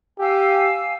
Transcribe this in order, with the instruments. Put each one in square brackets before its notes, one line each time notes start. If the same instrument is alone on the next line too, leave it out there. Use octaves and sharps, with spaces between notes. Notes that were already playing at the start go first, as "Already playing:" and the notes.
[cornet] G4 [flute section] F5 G#5 E6